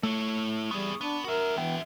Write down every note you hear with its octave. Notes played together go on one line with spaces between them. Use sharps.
A3 E4 C#5
G3 B3 G#4 C#6 D#6
B3 D4
F#4 A#4 E5
E3 B3 G5